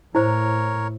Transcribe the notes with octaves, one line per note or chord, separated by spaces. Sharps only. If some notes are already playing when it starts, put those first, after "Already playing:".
A2 E4 A#4 C5 C#5